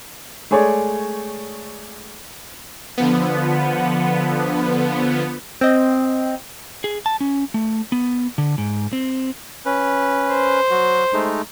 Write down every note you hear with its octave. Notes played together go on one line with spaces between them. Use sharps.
G#3 A3 G#4 C#5 D5
D3 F3 B3
C4 D#5
G#4
A5
C#4
A3
B3
D3
G#2
C4
C#4 B4
C5
F#3 F#4
G#3 A3 D#4